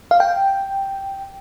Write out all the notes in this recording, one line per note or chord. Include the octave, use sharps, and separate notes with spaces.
F5
G5